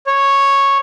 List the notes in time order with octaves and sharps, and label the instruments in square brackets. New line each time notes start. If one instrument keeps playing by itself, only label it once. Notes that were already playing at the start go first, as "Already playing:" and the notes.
[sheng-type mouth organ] C#5